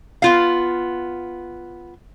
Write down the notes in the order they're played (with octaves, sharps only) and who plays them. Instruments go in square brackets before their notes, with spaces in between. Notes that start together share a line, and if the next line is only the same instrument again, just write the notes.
[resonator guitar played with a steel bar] B3 F4 F5